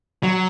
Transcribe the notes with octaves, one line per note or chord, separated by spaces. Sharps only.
F#3